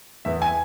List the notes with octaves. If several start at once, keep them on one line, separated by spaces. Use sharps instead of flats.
E2 E3 B3 E5
G#5